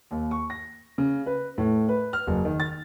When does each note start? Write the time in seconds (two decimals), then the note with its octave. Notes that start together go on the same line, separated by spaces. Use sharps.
0.11 D#2
0.31 C#6
0.50 A#6
0.98 C#3
1.26 B4
1.58 A2
1.89 B4
2.13 F6
2.27 F#1
2.45 D#3
2.60 A6